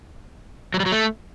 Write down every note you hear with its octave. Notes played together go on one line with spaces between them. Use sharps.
F#3
G3
F#3
A3